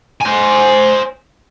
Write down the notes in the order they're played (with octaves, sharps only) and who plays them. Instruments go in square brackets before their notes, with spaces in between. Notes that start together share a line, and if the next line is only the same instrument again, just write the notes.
[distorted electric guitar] C5 G#5